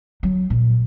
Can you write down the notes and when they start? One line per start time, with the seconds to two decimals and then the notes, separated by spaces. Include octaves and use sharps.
0.23 F#3
0.50 A#2